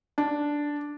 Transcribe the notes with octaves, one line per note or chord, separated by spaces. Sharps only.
D4